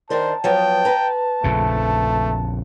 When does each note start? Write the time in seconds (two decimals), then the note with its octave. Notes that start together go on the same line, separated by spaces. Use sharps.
0.10 D#3 D4 A#4 C5 A5
0.44 F3 F#3 B3 G5
0.85 B4 A#5
1.44 A#1 F2 C#3 A3